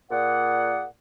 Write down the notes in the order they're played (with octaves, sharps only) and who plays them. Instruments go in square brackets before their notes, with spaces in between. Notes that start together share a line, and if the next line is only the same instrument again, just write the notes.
[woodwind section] A#2 G#4 D5 F#5